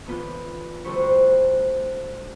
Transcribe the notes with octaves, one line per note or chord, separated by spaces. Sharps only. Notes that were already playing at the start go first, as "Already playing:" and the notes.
D3 E3 B3 F4 B5 G6
D2 D3 G3 C5 B5 C#6